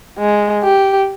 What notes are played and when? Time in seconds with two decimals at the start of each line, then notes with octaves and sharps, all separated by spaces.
0.18 G#3
0.63 G4